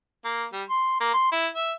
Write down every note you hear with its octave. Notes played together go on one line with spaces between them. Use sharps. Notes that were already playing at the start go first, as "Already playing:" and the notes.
A#3
G3
C6
A#3
C6
E4
E5